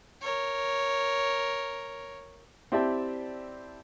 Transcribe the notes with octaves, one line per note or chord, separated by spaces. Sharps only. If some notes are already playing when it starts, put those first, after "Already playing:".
A#4 C#5
C4 E4 G4 D5 E5 A5